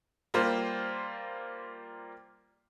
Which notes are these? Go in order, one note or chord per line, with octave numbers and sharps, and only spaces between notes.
G3 A#3 F4 C5